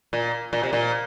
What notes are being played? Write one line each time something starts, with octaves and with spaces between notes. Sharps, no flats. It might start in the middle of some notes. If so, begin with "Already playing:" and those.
A#2
A#2
C3
A#2